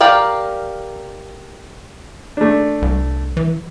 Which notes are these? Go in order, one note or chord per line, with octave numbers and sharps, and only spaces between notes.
G4 A#4 D5 F5
A3 D4
C2
E3